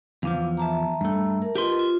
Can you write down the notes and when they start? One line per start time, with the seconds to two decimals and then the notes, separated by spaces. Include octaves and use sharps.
0.23 E2 E3 F3 F5 D6
0.57 E5 A5 A#5
1.01 G2 A3
1.42 A#4
1.55 F4 G4 B4 D#5 C6
1.79 F4